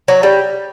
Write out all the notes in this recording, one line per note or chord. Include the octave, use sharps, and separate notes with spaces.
F#3
G3